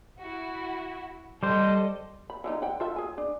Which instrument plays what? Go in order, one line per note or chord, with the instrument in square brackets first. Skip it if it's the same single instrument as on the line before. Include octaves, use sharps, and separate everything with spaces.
[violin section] E4 F#4
[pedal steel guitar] G3 C5 [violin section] A4 D#5
[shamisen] B5
D3 E3 D#4
F#5 G5
F4 A4 E5
G#4 G#5
D4